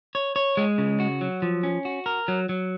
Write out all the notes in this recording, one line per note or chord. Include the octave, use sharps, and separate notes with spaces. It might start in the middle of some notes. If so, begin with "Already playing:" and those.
C#5
C#5
G#3
C#3
F#4
F#3
F3
C#4
F#4
A#4
F#3
F#3